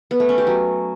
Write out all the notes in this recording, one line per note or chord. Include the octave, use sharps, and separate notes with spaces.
B3
A3
C#4
G4
F#3